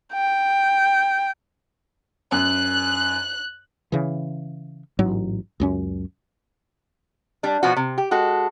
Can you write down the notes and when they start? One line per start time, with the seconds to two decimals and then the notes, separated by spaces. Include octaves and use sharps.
0.13 G5
2.32 F#2 F#6
3.92 C#3 E3
4.99 A1 G#2 F#3
5.60 C#2 F#2 C#4
7.43 G3 D4
7.63 B2 F3 F#4
7.77 C3
7.98 G4
8.11 G#3 F#4 A4